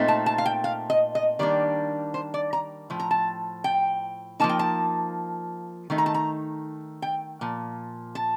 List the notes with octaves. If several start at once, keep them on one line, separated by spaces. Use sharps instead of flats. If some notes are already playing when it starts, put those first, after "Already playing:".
Already playing: A#2 A3 C4 D#4
A5
A5
F5
G5
F5
D#5
D#5
D#3 G3 A#3 D4 D5
C5
D5
A#5
A2 F3
A#5
A5
G5
F3 A#3 D#4 A5
G5
A5
D#3 A3 D#4
A#5
A5
A#5
G5
A#2 F3
A5